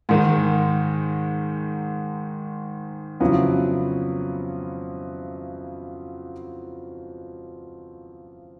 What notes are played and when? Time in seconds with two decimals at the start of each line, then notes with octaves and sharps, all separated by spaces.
0.09 G#2 D#3 G#3
3.20 F2 C#3 F#3 B3 E4